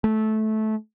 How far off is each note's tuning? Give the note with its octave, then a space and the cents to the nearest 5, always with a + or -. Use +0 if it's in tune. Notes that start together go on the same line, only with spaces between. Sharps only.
A3 -15